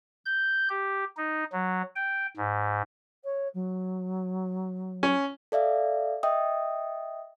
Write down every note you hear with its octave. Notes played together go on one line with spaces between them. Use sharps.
G6
G4
D#4
F#3
G5
G#2
C#5
F#3
C#4
A4 D5 E5 F5
D#5 E5 G5 D#6